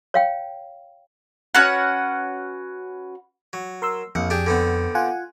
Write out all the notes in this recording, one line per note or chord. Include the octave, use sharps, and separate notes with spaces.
C#5 F5 G5
C#4 F#4 B4 F#5
F#3
A#4 C6 E6
A#1 F2 F#5
D4 G4 G#4
D3 B3 C4
F4 F#5 G#5